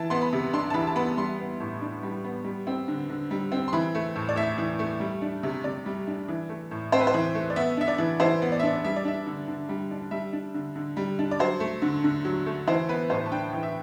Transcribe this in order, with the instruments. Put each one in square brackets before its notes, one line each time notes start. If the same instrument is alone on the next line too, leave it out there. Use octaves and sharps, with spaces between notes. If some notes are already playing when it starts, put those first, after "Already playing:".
Already playing: [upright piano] E3 A5
B3 C6
B5
C3
D4 C6
A5
E3 B5
A5
B3 B5
G3 C6
B3
A2
D4
G3
B3
G3
C4
D3
D3
G3
C4
C6
E3 B5
A3
A2
D5
A2 E5
E3
A3
G3
D4
C3
C3 D5
G3
D4
E3
A3
A2
C4 C5
B4
C5
E3
A3
D5
B3 E5
D4 E5
D5
E3
E3 C5
B3
D5
E5
D4 D5
G3 E5
D5
D4 E5
D3
D3
G3
D4
G3 E5
D4
D3
D3
G3
D4
D5
F#3 C5
A3
D3
D3
F#3
A3
E3 C5
B3 B4
A2 C5
A5
D4 G5
E3
E5